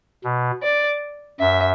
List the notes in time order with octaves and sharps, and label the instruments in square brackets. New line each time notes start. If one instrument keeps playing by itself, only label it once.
[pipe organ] B2
[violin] D5
[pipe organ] F#2 [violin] E5